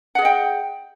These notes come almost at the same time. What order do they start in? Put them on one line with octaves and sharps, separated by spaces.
F#5 G#4 D#5 G5